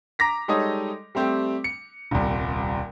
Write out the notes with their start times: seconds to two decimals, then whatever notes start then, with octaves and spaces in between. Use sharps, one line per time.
0.19 A#5 D6 A#6 B6
0.48 G3 G#3 D#4 A4 C#5 D#5
1.15 G3 A3 C4 G4
1.64 C#7
2.11 D#1 C2